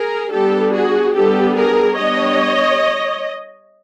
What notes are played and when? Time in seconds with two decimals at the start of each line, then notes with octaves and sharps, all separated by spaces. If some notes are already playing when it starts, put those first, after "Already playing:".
Already playing: G#4 A#4
0.31 G3 B3 D4 G4 A4
0.73 F#4 G#4
1.14 G3 B3 D4 G4 A4
1.56 G#4 A#4
1.98 G3 B3 D4 C#5 D#5